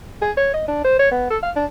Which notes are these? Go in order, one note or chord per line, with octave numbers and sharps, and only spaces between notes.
G#4
C#5
D#5
D4
C5
C#5
B3
A4
F5
D4